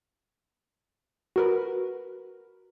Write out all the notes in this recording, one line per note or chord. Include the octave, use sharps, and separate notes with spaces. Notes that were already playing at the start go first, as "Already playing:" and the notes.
F#4 A#4 B4